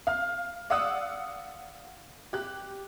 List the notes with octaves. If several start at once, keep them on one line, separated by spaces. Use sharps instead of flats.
F5 F6
D5 F5 F#5 D#6 E6 F#6
G4 F#6